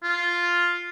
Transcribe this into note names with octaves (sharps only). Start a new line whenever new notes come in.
F4